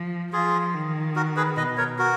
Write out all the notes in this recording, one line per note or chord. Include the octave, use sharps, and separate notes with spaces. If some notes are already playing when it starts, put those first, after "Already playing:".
Already playing: F3
F3 F4 G#4
D#3
F#4 A#4
G#4 B4
B2 B4 D#5
A#4 C#5
F#4 A#4